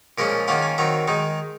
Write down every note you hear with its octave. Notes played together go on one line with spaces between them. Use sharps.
A#2 F3 G#3 C#4 A#4
D#3 A#3 C#4 F4 F#5
G#5
D#3 F#3 C4 A#5
D#3 G#3 D#4